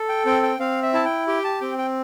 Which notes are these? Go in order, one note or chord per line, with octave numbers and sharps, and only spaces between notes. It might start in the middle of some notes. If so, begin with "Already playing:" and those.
Already playing: A4
G5
C4 G5
G5
C4 F5
E5
E4 A5
G5
G4 G5
A5
C4 G5
G5